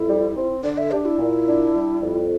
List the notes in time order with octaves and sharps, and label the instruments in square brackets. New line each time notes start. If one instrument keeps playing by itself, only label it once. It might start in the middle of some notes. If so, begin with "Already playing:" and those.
Already playing: [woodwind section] F2 [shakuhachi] E4
[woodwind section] G3
C4
[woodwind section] D3 [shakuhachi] D5
[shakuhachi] E5
[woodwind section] D4 [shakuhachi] G4
[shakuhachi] E4
[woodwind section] A#2
D4
G3
F2